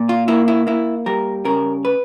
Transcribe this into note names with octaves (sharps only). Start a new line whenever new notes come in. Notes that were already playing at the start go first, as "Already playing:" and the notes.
Already playing: A#2
F4
A#3 E4
E4
A#3 E4
G3 A#4
C#3 A#4
B4